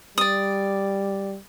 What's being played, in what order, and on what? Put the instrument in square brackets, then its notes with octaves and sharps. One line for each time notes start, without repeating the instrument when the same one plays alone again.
[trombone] G3 [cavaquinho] D5 D#6